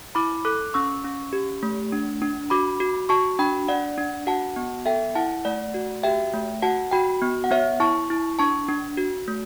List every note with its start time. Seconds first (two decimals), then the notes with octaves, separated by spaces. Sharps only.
0.15 E4 B5 D6
0.45 A4 D6 F#6
0.74 C#4 C#6 E6
1.04 C#4
1.33 G4
1.63 A3
1.92 D4
2.22 D4
2.50 F#4 B5 D6
2.80 F#4
3.09 F#4 A5 C#6
3.39 D4 G5 B5
3.68 D4 D5 F#5
3.98 D4
4.27 F#4 F#5 A5
4.56 B3
4.86 A4 E5 G5
5.15 E4 F#5 A5
5.45 A3 D5 F#5
5.74 F#4
6.03 G4 E5 G5
6.33 A3
6.62 F#4 F#5 A5
6.91 F#4 G5 B5
7.22 B3
7.44 F#5
7.51 B3 C#5 E5
7.80 E4 A5 C#6
8.10 E4
8.39 D4 A5 C#6
8.69 D4
8.97 F#4
9.28 A3